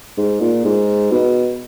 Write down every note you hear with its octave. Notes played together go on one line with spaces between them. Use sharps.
G#2
A#2
G#2
B2